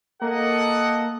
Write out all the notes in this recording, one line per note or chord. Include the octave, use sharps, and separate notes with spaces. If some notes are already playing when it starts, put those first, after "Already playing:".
A#3 A4 D#5 F#5